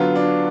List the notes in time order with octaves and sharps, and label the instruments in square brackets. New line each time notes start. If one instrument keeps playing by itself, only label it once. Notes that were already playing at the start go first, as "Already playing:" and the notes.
Already playing: [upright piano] D3 F#3 B3 [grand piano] F4
[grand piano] D4